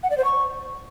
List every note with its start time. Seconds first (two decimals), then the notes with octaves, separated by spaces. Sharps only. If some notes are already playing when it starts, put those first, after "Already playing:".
0.03 F#5
0.10 D5
0.17 C5
0.24 C#6